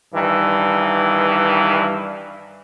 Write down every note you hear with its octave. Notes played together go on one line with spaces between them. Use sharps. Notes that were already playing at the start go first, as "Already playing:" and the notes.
G2 D#3 E3